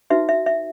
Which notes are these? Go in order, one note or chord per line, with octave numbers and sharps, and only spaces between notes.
D#4 F#4 B4 E5
E5
E5